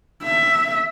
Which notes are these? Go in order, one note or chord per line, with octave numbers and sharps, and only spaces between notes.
E5